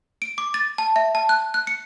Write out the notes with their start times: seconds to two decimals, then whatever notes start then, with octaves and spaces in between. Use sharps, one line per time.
0.22 D7
0.38 D6
0.54 A6
0.78 A5
0.96 E5
1.15 A5
1.29 F#6
1.54 F#6
1.67 C#7